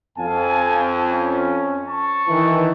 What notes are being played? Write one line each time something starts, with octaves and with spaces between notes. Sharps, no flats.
F2 F5 G#5 A5
C#4
A5 C#6
D#3 E3